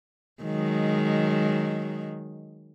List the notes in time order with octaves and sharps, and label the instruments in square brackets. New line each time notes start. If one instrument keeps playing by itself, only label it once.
[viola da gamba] D#3 F#3 G#3